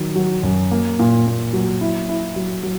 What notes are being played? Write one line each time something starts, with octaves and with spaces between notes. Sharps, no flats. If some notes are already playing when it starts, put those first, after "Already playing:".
Already playing: D#3 F#3
F#3
F#2
A#3
A#2
A#3
F#3
E4
E4
F#3
F#3